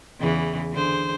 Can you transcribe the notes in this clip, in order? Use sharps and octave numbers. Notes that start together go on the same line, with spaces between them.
E2 C#3 E3
D3 G#4 C5